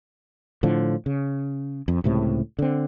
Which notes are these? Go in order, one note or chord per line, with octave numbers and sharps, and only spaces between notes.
A2 D3 F3
C#3
F2
C#2 A2 C3
D3 C4